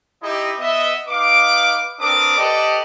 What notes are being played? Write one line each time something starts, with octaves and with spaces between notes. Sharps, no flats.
D#4 E4 G4 D#5
B3 D#5 E5
D#4 B4 F5 D6
C4 D4 A#4 B4 D6 D#6
G4 A4 B4 D5 D#5